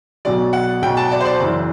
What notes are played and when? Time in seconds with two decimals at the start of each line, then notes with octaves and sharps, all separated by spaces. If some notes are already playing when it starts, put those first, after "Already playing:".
0.25 B1 B2 F#3 D5
0.53 F#5
0.82 B1 B2 F#3 G5
0.97 A5
1.11 D5
1.20 C5
1.25 D5
1.40 F#1 F#2 E3